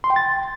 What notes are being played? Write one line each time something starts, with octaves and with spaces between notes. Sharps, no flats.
C6
G5
A6